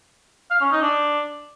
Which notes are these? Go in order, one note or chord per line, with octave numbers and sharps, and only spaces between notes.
F5
C#4
D#4
D4